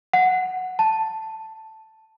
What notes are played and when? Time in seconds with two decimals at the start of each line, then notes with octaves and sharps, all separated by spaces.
0.13 F#5
0.79 A5